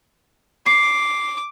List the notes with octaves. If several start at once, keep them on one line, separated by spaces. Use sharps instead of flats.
D6 C7